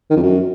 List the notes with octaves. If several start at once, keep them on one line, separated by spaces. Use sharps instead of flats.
D#3
F2
F#2